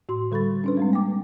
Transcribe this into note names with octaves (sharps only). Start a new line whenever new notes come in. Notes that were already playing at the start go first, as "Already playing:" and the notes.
A2 F#4 C6
D3 G3 A4 B5 C#6 A6
C#4 D4 B4
G3 G#3 C4
A#3 G5 D6